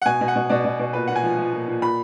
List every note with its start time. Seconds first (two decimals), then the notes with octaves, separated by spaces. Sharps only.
0.02 F#5
0.06 B2 G#5
0.21 B2
0.28 F#5
0.36 B2
0.49 B2 D5
0.65 B2
0.79 B2
0.93 A#2 B4
1.07 A#2 F#5
1.16 G#5
1.23 F3
1.38 F3
1.53 A#2
1.68 A#2
1.82 A#2 B5